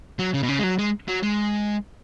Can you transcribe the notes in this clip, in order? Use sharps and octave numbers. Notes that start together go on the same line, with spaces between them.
F#3
C#3
B2
C#3
G#3
F#3
G#3
F#3
G#3